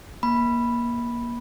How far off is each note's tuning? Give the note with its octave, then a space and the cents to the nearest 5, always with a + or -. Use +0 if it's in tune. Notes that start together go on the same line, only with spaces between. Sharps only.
A#3 +25 B5 -5